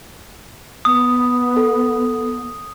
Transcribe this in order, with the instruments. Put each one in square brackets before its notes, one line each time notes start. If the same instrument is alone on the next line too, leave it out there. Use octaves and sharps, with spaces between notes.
[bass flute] B3 [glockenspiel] D#6
[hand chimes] A4